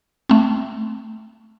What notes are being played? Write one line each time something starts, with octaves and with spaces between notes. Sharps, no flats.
A3 C4